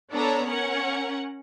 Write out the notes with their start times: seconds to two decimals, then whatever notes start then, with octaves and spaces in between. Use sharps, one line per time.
0.12 B3 D4 A4 B4 C#5 A#5
0.47 C#4 A#4 F#5